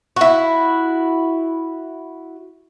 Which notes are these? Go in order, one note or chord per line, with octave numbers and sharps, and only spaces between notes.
E4 F#4